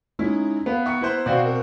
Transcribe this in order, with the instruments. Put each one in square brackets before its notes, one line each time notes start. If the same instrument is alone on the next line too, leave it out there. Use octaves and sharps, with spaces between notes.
[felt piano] G#3 C#4 E4 [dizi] D#4
[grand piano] B3 [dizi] F5 [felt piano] B5
[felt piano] E5 C#6 C#7 [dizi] A#5
[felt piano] B3 [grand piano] E4 B4 C5
[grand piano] B2 C4 F#4 [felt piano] D5 [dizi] F5
[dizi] A#4